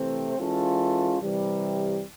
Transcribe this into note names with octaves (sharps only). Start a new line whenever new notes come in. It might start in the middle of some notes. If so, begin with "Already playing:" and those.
Already playing: C3 E3 A3 C4
E3 G#3 C#4 F4 A4
C3 E3 G3